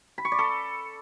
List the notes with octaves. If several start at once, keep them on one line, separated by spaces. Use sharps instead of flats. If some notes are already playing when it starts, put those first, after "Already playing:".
B5
C#6
D5
A4